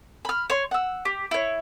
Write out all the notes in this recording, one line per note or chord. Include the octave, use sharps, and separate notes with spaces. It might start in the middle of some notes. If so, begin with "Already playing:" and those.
B5 F6
C#5 C6
F#5 E6
G4
E4 C#5